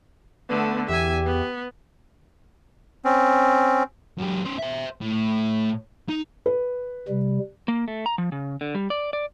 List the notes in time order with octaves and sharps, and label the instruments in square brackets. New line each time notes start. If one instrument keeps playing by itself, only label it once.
[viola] D3 A3 [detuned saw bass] B3
[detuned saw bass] E2 [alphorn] G4 [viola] E5 G#5
[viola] B3
[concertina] C4 C#4
[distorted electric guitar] F#2 G4
C#4 C5
C5 E5
A2
D#4
[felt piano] B4
[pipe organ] C3 G3
[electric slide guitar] A#3
A3
A#5
F3
C#3
D3
G3
D5
D5